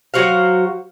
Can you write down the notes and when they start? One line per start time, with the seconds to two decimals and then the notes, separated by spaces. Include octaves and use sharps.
0.14 F#3 F#4 C5 F5